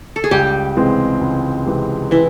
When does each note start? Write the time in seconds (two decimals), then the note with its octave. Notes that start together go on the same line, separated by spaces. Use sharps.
0.16 A4
0.24 G#4
0.31 C#2 G3 G4
0.76 C3 E3 G#3 C4
1.21 C#2
1.66 C3 E3 G#3 C4
2.11 E3 E4